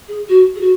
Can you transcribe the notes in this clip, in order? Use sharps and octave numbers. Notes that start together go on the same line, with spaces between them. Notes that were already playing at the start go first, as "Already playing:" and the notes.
G#4
F#4
G#4
F#4